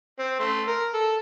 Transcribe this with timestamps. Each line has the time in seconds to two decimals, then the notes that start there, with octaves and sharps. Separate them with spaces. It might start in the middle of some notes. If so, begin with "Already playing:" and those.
0.19 C4
0.40 A3 C6
0.67 A#4
0.94 A4